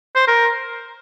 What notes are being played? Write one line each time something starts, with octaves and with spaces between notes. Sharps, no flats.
C5
A#4